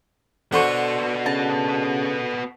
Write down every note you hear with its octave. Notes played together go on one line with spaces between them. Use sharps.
D3 B3 F#4 A4 C5 C#6
C#3 A5